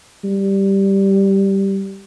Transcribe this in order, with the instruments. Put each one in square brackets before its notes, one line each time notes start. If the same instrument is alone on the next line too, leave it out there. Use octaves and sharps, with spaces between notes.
[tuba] G3